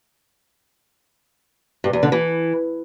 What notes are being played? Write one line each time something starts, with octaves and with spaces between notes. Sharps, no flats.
G2
E2
D3
E3